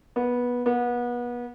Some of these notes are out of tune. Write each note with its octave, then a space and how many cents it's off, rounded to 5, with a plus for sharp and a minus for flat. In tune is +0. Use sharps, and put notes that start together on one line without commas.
B3 -15
B3 -30